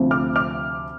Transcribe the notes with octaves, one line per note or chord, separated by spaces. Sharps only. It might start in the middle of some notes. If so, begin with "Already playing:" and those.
Already playing: D2 C3 F3 C4
D6 F6
D6 F6